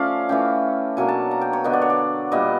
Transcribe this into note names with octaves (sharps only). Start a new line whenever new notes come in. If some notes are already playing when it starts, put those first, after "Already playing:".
Already playing: F3 A3 C#4 D5 F5
E3 A3 C#4 G5
B2 F#3 A#3 D4 G#5
A5
A#5
G5
C#5
D3 F#3 B3 D4 D#5
D5
C#5
D5
A#2 G3 B3 D#5